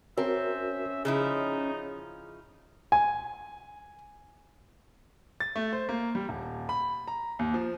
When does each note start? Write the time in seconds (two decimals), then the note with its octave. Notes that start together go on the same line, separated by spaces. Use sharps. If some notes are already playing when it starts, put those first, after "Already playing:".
0.17 C4 C#4 F#4 A#4 E5
1.05 C#3 F3 D#4 E4 G#4
2.92 G#5
5.40 A6
5.56 A3
5.73 C5
5.89 A#3
6.15 G3
6.29 D#1
6.69 B5
7.08 A#5
7.39 D#2
7.54 F3